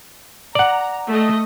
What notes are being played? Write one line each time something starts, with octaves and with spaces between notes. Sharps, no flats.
D5 F#5 A#5
A3 D#5